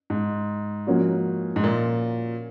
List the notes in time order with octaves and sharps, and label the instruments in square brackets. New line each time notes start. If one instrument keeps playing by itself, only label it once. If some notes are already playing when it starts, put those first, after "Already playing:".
[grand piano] G#2
[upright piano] F3 A#3 C#4 F#4
[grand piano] G#2
A#2